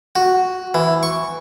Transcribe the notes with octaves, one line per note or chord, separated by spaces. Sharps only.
F#4
E3
C#6